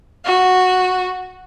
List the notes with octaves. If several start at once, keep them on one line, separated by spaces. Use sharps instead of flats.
F#4